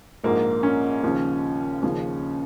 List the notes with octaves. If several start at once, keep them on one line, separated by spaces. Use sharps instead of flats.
A#1 G#2 F3 A#3
C#4
D#2 C#3 F3
D#2 C#3 F3